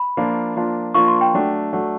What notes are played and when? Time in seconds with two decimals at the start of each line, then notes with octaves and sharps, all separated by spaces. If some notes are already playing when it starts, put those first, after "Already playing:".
Already playing: B5
0.17 F3 A#3 D4 F4
0.56 F3 A#3 D4 F4
0.94 F3 A#3 D4 F4 C#6
1.08 C6
1.21 G5
1.34 F#3 A3 D4
1.73 F#3 A3 D4